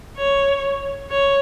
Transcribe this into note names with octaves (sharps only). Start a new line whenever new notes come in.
C#5
C#5